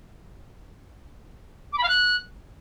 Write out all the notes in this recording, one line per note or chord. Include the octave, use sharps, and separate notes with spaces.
D6
B5
F5
F#6